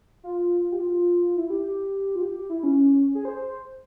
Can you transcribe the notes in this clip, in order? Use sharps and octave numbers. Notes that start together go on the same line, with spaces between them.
F4
G4
F4
E4
G4
F4
G4
E4
C#4
G#4
C5